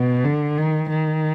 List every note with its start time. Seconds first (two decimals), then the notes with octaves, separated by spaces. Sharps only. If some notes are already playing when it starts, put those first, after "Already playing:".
Already playing: B2
0.24 D3
0.57 D#3
0.90 D#3